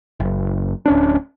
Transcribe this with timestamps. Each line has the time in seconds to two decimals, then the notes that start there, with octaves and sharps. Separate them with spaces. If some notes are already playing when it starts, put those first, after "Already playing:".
0.20 F#1
0.86 D1 C#4 D4